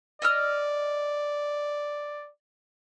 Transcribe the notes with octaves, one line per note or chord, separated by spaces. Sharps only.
D5 D#5 E6 F6